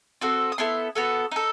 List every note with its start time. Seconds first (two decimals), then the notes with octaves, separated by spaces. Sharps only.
0.21 C4 F#4 A4
0.52 D#6
0.58 B3 E4 A4 C6
0.95 B3 F#4 A4
1.31 D#4 A4